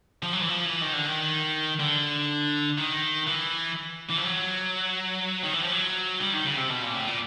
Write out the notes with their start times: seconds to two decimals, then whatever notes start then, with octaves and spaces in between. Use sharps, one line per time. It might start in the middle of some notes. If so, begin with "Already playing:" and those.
0.23 F3
0.33 F#3
0.41 E3
0.49 F3
0.65 E3
0.81 D#3
0.93 D3
1.06 D#3
1.80 D3
2.78 D#3
3.27 E3
4.10 E3
4.18 F3
4.25 F#3
5.43 D#3
5.53 E3
5.63 F3
5.72 F#3
6.21 G3
6.33 D#3
6.45 C#3
6.58 C3
6.70 B2
6.82 A#2
6.94 A2
7.07 A#2